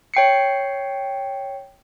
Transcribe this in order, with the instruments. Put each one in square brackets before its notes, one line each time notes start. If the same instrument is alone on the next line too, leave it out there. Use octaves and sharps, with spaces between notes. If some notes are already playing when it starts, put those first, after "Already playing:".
[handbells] C#5 G5 C7 C#7